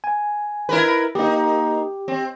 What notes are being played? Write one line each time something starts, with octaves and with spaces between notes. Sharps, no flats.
G#5
E4 A#4 B4
A#3 D#4 G4
C4